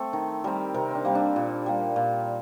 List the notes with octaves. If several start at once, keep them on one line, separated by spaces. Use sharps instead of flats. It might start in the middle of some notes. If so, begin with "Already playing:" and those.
Already playing: A3 C4 A4
D#3
G3 C4 A#4
C3 A#4
C4 D4
G3 A#3
D4
A#2
G3 A#3
A#2